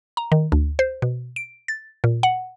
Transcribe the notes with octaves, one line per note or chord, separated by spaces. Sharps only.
A#5
D#3
D2
C5
B2
D7
A6
A#2
F#5